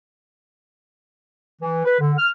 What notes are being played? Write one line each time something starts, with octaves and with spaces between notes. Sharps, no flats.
E3
B4
D3
F6